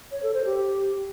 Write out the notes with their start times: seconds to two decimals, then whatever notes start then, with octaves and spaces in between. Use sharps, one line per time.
0.11 C#5
0.23 A4
0.34 C5
0.45 G4